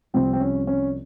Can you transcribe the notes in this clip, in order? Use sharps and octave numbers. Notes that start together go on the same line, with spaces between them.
C2 C3 F3 C4
C4
C#4
C#4